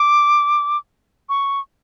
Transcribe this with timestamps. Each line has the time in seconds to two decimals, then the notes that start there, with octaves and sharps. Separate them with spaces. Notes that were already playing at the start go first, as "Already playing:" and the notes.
Already playing: D6
1.29 C#6